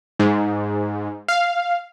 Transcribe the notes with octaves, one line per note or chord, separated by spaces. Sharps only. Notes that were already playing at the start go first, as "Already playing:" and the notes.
G#2
F5